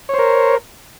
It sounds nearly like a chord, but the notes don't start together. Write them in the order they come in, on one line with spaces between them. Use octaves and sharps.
C#5 C5 A#4